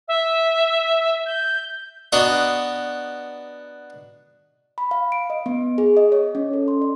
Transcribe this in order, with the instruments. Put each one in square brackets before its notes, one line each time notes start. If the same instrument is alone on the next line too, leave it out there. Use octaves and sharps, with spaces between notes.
[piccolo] E5
G6
[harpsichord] B3 D4 F#4 B4 D#5 A#5
[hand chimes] B5
F5
D7
D#5
B3
G#4
D#5
C#5
C#4
A4
C6
D5